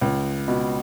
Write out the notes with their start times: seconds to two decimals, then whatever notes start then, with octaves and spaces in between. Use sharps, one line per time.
0.01 C#2
0.48 B2